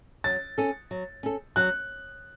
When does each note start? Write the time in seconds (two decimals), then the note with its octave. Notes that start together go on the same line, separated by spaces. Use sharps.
0.24 F#3 A6
0.58 C#4 A4
0.91 F#3
1.23 C#4 A4
1.56 F#3 F#6